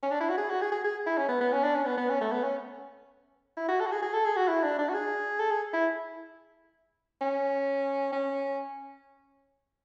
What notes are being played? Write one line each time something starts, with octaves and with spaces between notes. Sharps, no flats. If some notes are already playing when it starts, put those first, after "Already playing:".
C#4
D4
E4
F#4
G#4
F#4
G#4
G#4
G#4
E4
C#4
B3
B3
C#4
D4
C#4
B3
B3
C#4
A3
B3
C#4
E4
F#4
A4
F#4
G#4
G#4
A4
G#4
F#4
E4
D4
D4
F#4
G#4
A4
G#4
E4
C#4
C#4